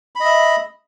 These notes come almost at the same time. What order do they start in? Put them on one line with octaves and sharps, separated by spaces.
B5 D#5 E5